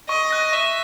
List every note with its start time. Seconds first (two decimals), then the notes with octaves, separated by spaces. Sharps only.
0.09 D#5 C#6
0.31 F#6 A#6
0.52 E5 C#6